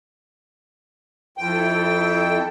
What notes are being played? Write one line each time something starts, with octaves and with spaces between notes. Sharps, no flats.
F2 E4 A4 G5